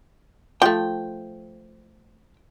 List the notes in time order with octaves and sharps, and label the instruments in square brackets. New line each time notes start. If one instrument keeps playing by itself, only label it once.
[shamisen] F3 A3 [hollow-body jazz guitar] G5